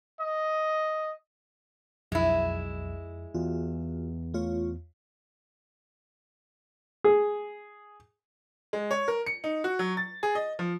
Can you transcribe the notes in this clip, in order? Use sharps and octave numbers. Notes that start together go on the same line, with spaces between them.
D#5
B1 F2 G#3 E4
E2 F4 F#4
A3 F4 C#5
G#4
G#3
C#5
A#4
C#7
D#4
F#4
F#3
A6
G#4
D#5
F3